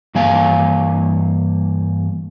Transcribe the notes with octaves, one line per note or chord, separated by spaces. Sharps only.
G2 E3 A#3 C#5 F5 G#5